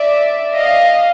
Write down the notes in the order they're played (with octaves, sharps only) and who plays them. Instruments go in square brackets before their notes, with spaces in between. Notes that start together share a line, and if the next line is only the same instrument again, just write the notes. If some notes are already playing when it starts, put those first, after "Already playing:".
Already playing: [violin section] D5 E5
D#5 F5